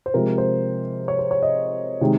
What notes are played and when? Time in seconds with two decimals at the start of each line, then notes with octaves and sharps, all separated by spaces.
0.06 C5
0.14 C3 F3 G#3 A#4
0.38 C5
1.08 C#5
1.19 C5
1.31 C#5
1.43 D#5
2.01 C3 D#3 G#3